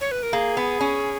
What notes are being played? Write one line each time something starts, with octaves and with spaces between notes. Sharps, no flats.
C#5
B4
A#4
A#3 G#4
B3
C#4